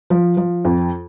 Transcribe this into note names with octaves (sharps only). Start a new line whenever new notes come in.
F3
F3
F2